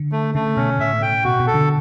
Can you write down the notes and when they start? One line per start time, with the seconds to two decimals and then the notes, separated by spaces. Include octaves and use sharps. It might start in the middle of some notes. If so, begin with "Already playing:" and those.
Already playing: D3
0.12 A3
0.35 C#3 A3
0.56 B2 C#4
0.79 A2 E5
1.02 G5
1.24 B2 F#4
1.40 B2
1.47 A4
1.54 D3